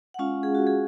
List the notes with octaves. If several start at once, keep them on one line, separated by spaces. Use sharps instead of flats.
F#5
G#3 C#4 F4 F5
G#4
F#4
G#4